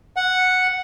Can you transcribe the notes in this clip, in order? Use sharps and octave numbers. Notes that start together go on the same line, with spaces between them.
F#5